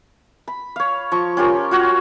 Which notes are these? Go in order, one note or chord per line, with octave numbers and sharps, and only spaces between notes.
B5
C#5 F5
F3 C#6
C#4 F4 G4 A#4
F4 F#4 C#5